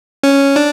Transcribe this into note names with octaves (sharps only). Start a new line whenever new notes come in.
C#4
D4